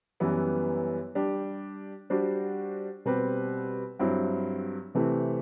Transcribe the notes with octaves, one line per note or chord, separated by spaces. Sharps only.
F#2 E3 G3 B3 E4
G3 D4 G4
G3 D4 F#4 C5
B2 G3 C4 G4 B4
G2 F#3 C4 E4
C3 E3 A3 C4 E4